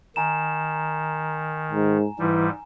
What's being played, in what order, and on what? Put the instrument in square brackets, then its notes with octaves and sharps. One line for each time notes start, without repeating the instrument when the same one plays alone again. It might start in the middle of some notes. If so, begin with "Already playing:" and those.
[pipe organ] D#3 [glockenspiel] G#5 A#5 E7
[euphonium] G#2
[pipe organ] G#2 G3 [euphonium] E3